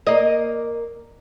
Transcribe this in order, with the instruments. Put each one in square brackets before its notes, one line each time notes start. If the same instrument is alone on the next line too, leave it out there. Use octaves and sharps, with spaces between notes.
[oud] A#3 D#5